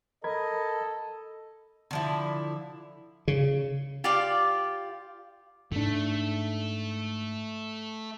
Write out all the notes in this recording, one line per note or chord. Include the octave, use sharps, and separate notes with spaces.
A4 A#4 D#5 B5 G#6
D3 F3 E4
C#3
F4 G4 D5 F5
G#2 A3 D4